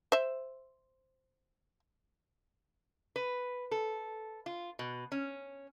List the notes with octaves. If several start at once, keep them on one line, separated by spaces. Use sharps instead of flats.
C5 E5
B4
A4
F4
B2
C#4